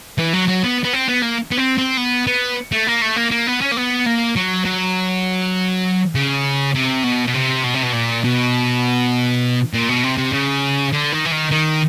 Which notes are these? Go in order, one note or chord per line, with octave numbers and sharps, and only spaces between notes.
E3
F#3
F#3
B3
B3
C4
B3
A#3
B3
C4
C4
B3
B3
A3
A#3
A3
A#3
A#3
B3
C#4
A#3
B3
A#3
F#3
F#3
C#3
C3
B2
B2
C3
B2
C3
B2
A#2
B2
A#2
B2
C3
C3
C#3
D3
D#3
E3
D#3
D#3